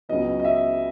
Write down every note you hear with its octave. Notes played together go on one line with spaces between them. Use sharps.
C#2 C#3 F#3 B3 D#5
D#5
E5